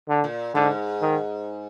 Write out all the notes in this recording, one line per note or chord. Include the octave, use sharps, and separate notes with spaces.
D3
A#2
G#2 D3
D#3